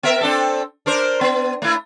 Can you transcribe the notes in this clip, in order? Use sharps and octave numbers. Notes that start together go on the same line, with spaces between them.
B3 A#4 E5
C4 D4 A4
D4 A#4 C5
B3
A3 E4